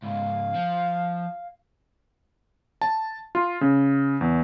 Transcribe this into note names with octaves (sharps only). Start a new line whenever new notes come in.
C#2 G#2 F5
F3
A5
F4
C#3
E2